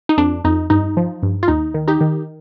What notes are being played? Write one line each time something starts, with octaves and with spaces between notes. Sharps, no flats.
D#4
F2 D4
F2 D#4
G2 D#4
F3
G2
F4
D#2 D#4
D#3
D#4 G4
D#3